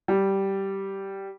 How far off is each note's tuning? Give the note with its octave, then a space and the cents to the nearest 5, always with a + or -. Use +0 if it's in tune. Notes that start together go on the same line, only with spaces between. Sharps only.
G3 -10